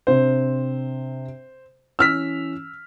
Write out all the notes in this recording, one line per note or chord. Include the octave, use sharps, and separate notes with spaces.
C3 C4 D4 C5
E3 C#4 E6 F6 B6